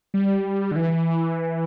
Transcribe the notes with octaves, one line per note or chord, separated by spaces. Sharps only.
G3
D3
E3